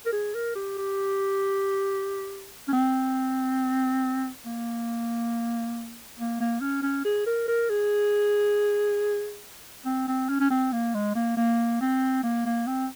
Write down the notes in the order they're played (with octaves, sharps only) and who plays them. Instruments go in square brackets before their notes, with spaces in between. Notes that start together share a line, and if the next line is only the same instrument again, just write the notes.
[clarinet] A#4
G#4
A#4
G4
G4
C#4
C4
A#3
A#3
A#3
C#4
C#4
G#4
A#4
A#4
G#4
C4
C4
C#4
C#4
C4
A#3
G#3
A#3
A#3
C4
A#3
A#3
C4